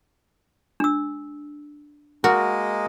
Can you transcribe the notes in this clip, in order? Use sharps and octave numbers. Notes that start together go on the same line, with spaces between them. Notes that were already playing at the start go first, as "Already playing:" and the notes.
D4 E6
G#3 A#3 F#4 A#4 D#5